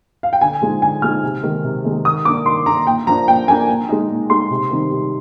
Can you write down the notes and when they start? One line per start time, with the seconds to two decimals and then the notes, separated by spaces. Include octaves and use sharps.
0.23 F5
0.33 G5
0.41 D3 G#5
0.62 F3 G#3 D#4
0.82 D3 G#5
1.02 F3 G#3 D#4 F6
1.23 C3
1.43 D#3 G#3 D#4
1.64 C3
1.85 D#3 G#3 D#4
2.05 D#3 D#6
2.25 A#3 D4 D6
2.46 D#3 C6
2.66 A#3 D4 A#5
2.86 A#2 G5
3.07 F3 A#3 D4 A#5
3.28 A#2 G5
3.48 F3 A#3 D4 G#5
3.68 A#2
3.89 G#3 D#4
4.10 A#2
4.30 G#3 D#4 C6
4.50 C3
4.71 D#3 G3 C4 D#4
4.91 C3